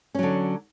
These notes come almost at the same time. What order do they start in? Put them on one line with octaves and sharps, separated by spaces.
C#4 F#3 D3